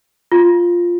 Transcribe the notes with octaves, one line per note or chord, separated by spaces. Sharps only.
F4